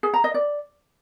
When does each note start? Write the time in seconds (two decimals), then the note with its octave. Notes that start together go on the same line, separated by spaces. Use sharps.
0.03 G#4
0.14 A#5
0.24 D#5
0.34 D5